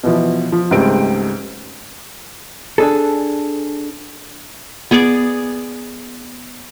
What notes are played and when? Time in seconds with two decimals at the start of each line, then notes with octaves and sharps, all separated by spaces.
0.04 B2 E3 F3
0.52 F3
0.71 C#2 G#2 G3 A3 C4 D7
2.78 D4 G#4 A4
4.91 B3 G#4 D5 D6